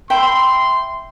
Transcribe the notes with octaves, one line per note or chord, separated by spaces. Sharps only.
E5 G5 B5 C6